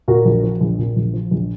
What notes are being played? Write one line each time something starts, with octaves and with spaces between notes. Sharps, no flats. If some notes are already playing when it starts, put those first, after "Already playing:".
A#2 F#4 A#4
A#1
F3
A#1
A#2
A#1
F3
A#1